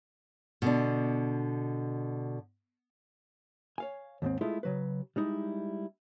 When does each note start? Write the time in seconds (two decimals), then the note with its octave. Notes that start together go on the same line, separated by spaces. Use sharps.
0.62 B2 D3 D4
3.78 C#5 F5 G#5
4.22 D#2 G#2 A#3 C4
4.41 G#3 A3 E4 F4 G#4 A4
4.63 C#3 F#3 B4
5.16 G3 G#3 D#4 E4